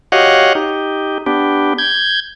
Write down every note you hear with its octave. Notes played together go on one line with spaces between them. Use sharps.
F#4 G4 C#5 D#5 F5 F#5
D#4 G4
B3 D4 G4
G6 G#6